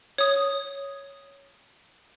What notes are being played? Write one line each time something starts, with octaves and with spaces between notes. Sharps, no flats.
C#5 D#6